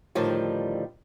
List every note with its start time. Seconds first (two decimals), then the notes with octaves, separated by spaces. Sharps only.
0.15 A2 D3 D#3 F3 G3